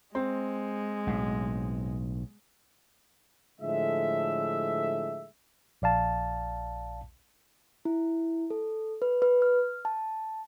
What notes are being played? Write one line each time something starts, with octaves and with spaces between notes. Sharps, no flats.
G#3 C4
B1 A2
A2 D3 F3 G#3 A4 E5
A#1 D5 F5 A5
E4
A4
B4
B4
F6
A5